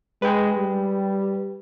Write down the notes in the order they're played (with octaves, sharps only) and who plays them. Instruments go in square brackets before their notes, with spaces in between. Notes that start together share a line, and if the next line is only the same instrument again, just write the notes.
[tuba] G#3 [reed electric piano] B4 G5
[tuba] G3